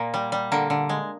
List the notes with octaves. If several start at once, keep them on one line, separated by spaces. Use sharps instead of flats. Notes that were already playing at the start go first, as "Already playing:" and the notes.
Already playing: A#2 A#3
G3
G3
D3 A#3
D3
G#3